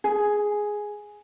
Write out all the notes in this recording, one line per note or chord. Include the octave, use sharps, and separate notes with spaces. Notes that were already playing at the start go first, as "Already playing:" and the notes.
G#4